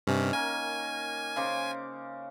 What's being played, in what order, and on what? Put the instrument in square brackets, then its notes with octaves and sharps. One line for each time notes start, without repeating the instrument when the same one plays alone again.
[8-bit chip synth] G2 C3 [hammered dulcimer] D#3 C#4
[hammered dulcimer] A#3 [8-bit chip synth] G#5
[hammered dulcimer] C#3 C5 D6